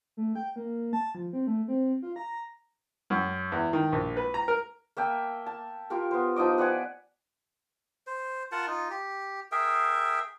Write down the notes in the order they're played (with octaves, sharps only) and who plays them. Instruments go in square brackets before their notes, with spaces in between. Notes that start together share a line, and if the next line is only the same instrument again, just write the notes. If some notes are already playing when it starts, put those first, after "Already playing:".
[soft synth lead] A3
G5
A#3
A5
F3
C4
A3
C4
F4
A#5
[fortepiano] F#2
E2
D#3
A#1
B4
A#5
A#4
[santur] A#3 E5 G5 A5
A5
F4 G4 A#4
B3 C5
F3 D#4 D#5 D6
B4 D5 F#5 G#5
[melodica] C5
F4 A#4 F#5 A5
D#4 F4
G4
G#4 A#4 E5 G5